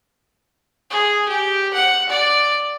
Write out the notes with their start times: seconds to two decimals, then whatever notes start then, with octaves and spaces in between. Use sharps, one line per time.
0.90 G#4
1.28 G4
1.73 F#5
2.09 D5